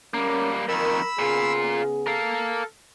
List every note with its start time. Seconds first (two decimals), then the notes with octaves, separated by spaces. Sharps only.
0.14 G3 A#3 C#4 A#4
0.69 F2 D#3 A#4 B5 E6
1.19 A#2 C#3 B3 F4 G#4
2.07 A4 A#4 F5